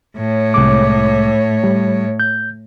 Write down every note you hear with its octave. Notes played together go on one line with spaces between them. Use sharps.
A2 C#5
C2 G#3 D6
G3
G6